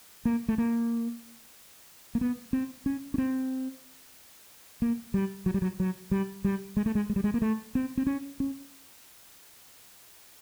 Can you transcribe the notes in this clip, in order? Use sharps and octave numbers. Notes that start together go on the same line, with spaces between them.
A#3
A3
A#3
A#3
B3
C4
C#4
C#4
C4
A#3
G3
F#3
G3
F#3
F#3
G3
G3
G#3
A3
G#3
G#3
G3
G#3
A#3
A3
C4
C4
C#4
C#4